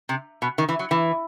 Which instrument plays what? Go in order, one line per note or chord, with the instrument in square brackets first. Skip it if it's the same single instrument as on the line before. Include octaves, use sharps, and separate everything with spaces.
[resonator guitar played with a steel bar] C3
B2
D#3
E3
F#3
E3